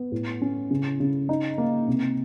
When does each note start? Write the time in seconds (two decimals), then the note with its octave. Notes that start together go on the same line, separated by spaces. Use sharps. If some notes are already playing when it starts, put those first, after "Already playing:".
Already playing: B3
0.12 A2
0.42 C#4
0.71 C#3
1.00 C#3
1.29 D#4
1.58 A#3
1.88 C3